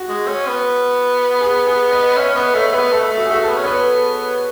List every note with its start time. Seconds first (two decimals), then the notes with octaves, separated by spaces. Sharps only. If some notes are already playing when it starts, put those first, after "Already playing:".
Already playing: F#4
0.09 G#3
0.28 C#4
0.48 B3
1.41 G#4
1.67 G#4
1.92 D#5
2.16 C#4 E5
2.35 B3 D#5
2.55 A3 C#5
2.67 A3
2.73 B3 B4
2.92 A3 A4
3.11 A3
3.18 F#4
3.26 G#4
3.30 A3 F#4
3.43 A4
3.49 B3
3.56 C#4
3.63 B3 C#5
3.68 B4